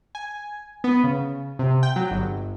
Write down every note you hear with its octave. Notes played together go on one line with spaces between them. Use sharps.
G#5
B3
C#3
C3
G5
F#3
G1